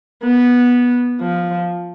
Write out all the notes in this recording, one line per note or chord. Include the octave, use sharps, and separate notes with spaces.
B3
F3